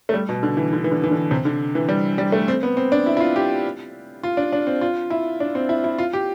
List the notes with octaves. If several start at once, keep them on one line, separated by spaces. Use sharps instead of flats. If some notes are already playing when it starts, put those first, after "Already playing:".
A3
G3
B2
D3
E3
D3
E3
D3
E3
D3
C3
D3
E3
G3
G3
A3
C4
B3
C4
D4
E4
E4
F4
G4
F4
D4
D4
C4
F4
E4
D4
C4
E4
E4
F4
G4